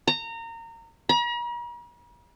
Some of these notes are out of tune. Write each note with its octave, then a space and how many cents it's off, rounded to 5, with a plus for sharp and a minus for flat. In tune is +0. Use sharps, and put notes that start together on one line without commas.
A#5 -25
A#5 +45